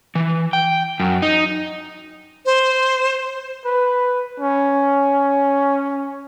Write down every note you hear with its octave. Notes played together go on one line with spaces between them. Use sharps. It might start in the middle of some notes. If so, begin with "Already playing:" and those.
E3
G5
F#2
D#4
C5
B4
C#4